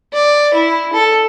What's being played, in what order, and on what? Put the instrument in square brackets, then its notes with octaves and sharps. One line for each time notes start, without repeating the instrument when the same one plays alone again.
[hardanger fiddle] D5
E4
A4